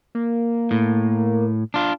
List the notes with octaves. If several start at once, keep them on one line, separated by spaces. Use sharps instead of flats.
A#3
A2
D4 F4